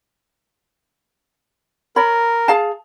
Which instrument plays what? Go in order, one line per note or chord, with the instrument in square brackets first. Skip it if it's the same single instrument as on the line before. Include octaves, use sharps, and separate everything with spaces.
[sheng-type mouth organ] A#4 [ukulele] C#5 B5
[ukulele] G#4 F5 A5